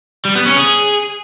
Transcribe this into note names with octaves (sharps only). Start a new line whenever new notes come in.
G3
B3
C#4
G#4